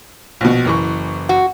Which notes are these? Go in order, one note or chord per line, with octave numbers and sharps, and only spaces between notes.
A#1 B2
F#1 E3 C#6
F#4